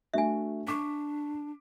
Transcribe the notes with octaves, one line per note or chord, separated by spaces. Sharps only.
A3 D4 F#4 E5 G#5
D4 C#6 D6 B6